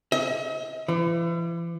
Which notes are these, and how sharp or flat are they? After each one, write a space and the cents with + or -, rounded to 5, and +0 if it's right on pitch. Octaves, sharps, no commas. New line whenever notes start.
D#5 +40
E3 +40